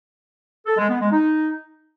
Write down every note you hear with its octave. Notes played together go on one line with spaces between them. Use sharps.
A4
G#3
B3
G#3
D#4